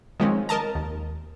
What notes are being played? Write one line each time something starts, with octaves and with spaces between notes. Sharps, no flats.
D#3 F3 G#3 C4 C#4
A#4 D#5 A5 A#5
D#2